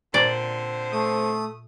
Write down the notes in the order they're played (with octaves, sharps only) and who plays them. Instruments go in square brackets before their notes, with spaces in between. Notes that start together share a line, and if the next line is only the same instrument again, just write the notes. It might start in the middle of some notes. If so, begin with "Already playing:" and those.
[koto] A#2 D5 [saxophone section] D3 C4 C5
[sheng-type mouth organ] A3 D#6